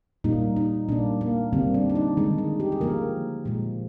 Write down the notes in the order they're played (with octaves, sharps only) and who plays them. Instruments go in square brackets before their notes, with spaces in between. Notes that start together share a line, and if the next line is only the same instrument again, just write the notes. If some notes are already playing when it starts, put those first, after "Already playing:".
[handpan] A#2 G3 A#3 D#4
D#4
A#2 G3 A#3 D4
A#3
D3 G3 A#3 C4
D4
D4
D#4
D#3 G#3 D#4
D#4
G4
G#4
D3 F3 A#3 A#4
A#2 F3 G#3